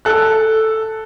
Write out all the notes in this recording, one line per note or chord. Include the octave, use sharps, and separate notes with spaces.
A4 F#6